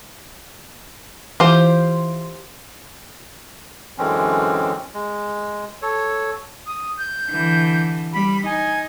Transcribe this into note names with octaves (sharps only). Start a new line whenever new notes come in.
E3 F4 G4 C5 C6
F#2 D3 E3 G#3 C4 C#4
G#3
A4 C#5
D#6
G6
D3 E3
G3 B5
D#4 G#5